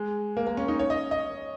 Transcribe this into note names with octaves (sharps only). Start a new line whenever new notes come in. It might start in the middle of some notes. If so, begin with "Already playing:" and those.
Already playing: G#3
A#3
A#3
C#4
D#4
C#5
D#5
D#5